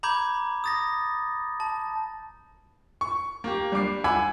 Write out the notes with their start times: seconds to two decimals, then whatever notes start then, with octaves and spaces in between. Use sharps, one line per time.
0.03 A#5 B5 D6 G6 G#6
0.64 D#6 A6 A#6
1.60 A5
3.01 C#6
3.44 A#3 G4
3.72 G3 D4 D6 C7
4.04 F#5 G#5 B5 D6 E6 G#6